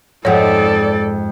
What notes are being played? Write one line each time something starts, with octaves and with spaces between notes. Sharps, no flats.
F2 G#2 A4 C#5 D5 F#5